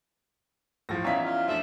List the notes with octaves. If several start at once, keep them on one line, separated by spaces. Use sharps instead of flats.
A2 F3 A#6
E2 C#4 D#4 E4 F5 A#5 C#6 B6
F4
F3 A3 D4 E5